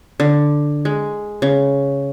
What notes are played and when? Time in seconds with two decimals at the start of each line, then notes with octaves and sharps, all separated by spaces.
0.20 D3
0.85 G#3
1.42 C#3